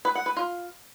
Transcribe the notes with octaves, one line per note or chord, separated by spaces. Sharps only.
B4
F#5
B4
F4